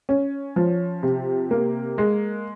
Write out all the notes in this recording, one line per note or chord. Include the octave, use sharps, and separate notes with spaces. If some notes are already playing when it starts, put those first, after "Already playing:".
C#4
F3
C3
A#3
G#3